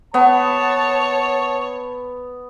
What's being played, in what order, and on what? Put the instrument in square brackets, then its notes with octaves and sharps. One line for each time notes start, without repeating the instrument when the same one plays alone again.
[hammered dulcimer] B3 [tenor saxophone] C#5 [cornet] A5